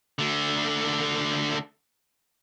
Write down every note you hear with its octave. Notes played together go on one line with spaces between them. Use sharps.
D3 A3